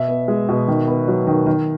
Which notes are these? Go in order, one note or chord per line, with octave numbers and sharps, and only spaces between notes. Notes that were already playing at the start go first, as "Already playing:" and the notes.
Already playing: B2 E5
B3
G#3
B2
D#3
B3
F#3
D#3
D#3